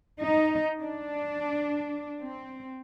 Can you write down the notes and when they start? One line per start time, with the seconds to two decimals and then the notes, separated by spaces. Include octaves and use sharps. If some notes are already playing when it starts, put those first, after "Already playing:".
0.21 D#4
0.82 D4
2.23 C4